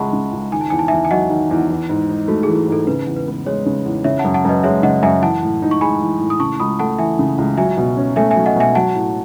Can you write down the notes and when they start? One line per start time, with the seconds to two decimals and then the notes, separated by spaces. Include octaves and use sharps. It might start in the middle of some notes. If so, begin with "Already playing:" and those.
Already playing: C#2 C#3 G#3 E5 F#5 A5 B5 C#6
0.13 C#3
0.32 C#2
0.52 D#3 G#5
0.61 A5
0.70 E2 G#5
0.79 A5
0.88 E5 G#5
0.91 E2
1.05 G#5
1.11 F#3 D#5 F#5
1.30 D#3
1.51 E2
1.70 E3
1.89 G#2
2.09 D#4
2.28 A3 F#4
2.43 G#4
2.48 E3
2.68 G#2 A4
2.87 C#3 B4
3.07 E2
3.16 B4
3.27 B3
3.46 G#3 C#5
3.66 C#3
3.86 E2
4.04 C#3 C#5 E5
4.19 F#5 A5
4.24 F#2
4.34 F#5 A5
4.45 F#2 B4 D#5
4.64 G#3 C#5 E5
4.83 C#3 D#5 F#5
5.02 F#2 E5 G#5
5.22 E3 F#5 A5
5.43 A2
5.62 D#4
5.71 C#6
5.81 G#3 G#5 B5
6.02 E3
6.21 A2
6.30 D#6
6.40 C#3 A5 C#6
6.60 C#2 B5 D#6
6.79 A3 F#5 A5
6.98 E3 E5 G#5
7.19 C#3
7.38 C#2
7.57 F#3 E5 G#5
7.77 B2
7.97 C#4
8.16 A3 E5 G#5
8.31 E5 G#5
8.36 F#3
8.46 D#5 F#5
8.56 B2 E5 G#5
8.75 F#3 F#5 A5
8.95 A2